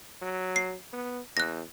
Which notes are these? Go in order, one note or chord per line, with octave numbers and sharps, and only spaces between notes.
F#3
C7
B3
E2 F#6 A#6